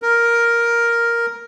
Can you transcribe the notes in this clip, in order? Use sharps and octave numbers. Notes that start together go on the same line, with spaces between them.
A#4